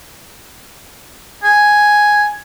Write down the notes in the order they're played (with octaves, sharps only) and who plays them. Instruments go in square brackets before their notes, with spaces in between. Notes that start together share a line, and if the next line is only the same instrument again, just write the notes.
[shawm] G#5